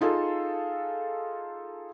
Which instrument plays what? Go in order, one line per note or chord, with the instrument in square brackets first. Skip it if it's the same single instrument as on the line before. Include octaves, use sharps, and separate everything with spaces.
[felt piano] D#4 F4 G#4 A4